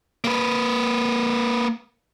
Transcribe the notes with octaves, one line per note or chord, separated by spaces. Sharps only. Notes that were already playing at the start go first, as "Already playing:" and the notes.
A#3 B4